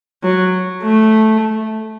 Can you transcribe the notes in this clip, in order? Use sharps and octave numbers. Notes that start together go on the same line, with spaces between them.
F#3
A3